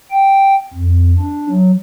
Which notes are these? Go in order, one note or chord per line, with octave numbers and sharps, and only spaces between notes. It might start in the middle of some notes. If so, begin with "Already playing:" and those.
G5
F2
D4
F#3